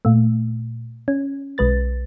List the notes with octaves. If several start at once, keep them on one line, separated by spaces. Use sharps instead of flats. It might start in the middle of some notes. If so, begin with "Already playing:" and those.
A#2 A3
C#4
B1 G#3 B4 A6